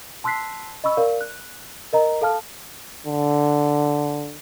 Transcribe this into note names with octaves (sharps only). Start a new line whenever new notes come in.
A5 C6 E6 F#6 B6 C7
D#5 B5 C#6 E6
A#4 D5 F5
F#6
A#4 D#5 A#5
A4 F5 A5 F6
D3